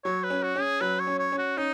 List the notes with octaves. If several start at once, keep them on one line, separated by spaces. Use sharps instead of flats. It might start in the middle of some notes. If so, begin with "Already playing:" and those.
F#3 C#5
B4
C#4
F#4
C#4
G#4
F#3 B4
C#5
C#4
C#5
C#4
F#4
C#4 D#4